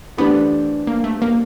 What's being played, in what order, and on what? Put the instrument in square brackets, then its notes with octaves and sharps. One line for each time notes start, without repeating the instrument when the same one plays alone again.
[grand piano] E3 A3 D4 G4 C5 [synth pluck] B3
[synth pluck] A#3
A3
A#3